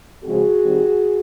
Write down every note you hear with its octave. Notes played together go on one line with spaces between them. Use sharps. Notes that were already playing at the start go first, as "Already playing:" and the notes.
C#3 F3 G#3 C4 F#4 G#4
D#3 G3 C4